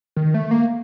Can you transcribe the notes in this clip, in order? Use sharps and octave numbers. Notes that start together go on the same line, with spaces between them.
D#3
A3
A#3